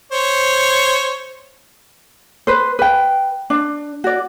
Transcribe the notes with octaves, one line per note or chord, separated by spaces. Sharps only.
C5 C#5
B4 C5
B4 G5
D4
F#4 D5